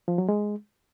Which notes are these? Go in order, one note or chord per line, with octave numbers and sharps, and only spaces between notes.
F3
F#3
G#3